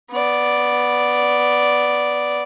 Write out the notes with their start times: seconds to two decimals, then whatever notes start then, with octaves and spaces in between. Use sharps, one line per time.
0.11 B3 D5